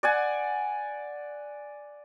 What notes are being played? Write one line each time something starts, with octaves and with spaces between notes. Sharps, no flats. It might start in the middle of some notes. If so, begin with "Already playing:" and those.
D5 F#5 G#5